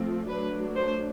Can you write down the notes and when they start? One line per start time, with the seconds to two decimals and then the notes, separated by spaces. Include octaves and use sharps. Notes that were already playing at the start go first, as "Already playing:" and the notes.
Already playing: F3 A3 C4
0.28 F#3 A3 D4 B4
0.76 C5